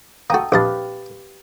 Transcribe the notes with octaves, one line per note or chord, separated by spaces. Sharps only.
A#3 F#4 A4 G5 D#6
A#1 G4 B4 D#5 F5 A5